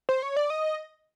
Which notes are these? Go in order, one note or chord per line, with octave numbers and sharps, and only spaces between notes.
C5
C#5
D5
D#5